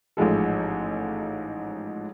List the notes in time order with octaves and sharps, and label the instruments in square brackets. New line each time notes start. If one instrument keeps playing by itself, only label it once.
[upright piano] A1 G#2 F3 G#3 A4